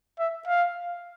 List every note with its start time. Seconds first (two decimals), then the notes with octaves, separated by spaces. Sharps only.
0.19 E5
0.47 F5